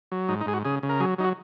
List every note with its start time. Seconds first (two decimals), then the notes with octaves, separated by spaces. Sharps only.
0.12 F#3
0.29 G#2 D#4
0.41 D#4
0.46 G#2 G#4
0.53 F#4
0.65 C#3 G#4
0.83 C#3
0.89 A#4
1.00 F#3 G#4
1.18 F#3 D#4
1.24 F#4